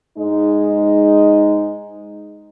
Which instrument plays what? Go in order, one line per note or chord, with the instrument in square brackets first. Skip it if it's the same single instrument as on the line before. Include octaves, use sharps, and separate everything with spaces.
[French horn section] G#2 G#3 D#4